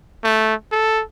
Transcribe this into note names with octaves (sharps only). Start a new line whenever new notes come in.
A3
A4